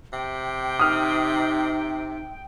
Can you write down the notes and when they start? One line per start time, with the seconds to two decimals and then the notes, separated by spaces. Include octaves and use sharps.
0.13 C3 G5
0.79 D#4 D#6 F6